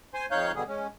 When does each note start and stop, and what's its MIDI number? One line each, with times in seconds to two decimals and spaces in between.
0.14 0.26 72
0.14 0.26 80
0.14 0.26 84
0.31 0.52 41
0.31 0.52 63
0.31 0.52 73
0.31 0.52 77
0.31 0.52 90
0.31 0.52 91
0.55 0.63 47
0.55 0.63 50
0.55 0.63 55
0.55 0.63 68
0.68 0.87 56
0.68 0.87 61